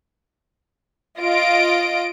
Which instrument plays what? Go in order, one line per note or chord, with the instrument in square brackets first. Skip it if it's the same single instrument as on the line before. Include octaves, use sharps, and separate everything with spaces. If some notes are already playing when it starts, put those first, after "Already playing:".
[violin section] F4 D#5 D7